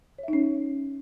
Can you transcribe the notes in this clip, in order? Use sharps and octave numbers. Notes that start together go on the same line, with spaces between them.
C#4 D#4 C#5 E5